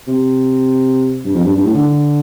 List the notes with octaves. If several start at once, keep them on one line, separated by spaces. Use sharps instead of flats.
C3
G2
F2
G2
G2
A2
D3